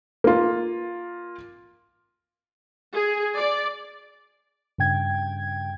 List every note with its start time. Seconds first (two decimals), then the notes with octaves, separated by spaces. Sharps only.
0.24 A#3 F4
2.95 G#4
3.36 D5
4.78 G2 C#3 G5 G#6